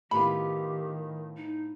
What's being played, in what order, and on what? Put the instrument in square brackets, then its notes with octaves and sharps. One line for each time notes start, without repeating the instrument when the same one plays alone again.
[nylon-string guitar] A2 B3 F4 [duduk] D#3 [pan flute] G4 [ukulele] B5
[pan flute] D#4